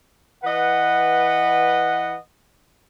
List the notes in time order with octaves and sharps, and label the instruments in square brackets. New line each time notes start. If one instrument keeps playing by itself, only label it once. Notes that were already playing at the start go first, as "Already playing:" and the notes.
[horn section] E3 B4 D#5 F#5